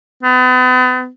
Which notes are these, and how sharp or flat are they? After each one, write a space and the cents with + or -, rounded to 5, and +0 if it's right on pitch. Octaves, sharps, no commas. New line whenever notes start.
B3 +40